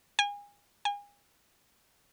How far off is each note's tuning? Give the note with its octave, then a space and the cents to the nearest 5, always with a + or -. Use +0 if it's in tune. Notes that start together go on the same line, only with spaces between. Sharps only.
G#5 -30
G#5 -35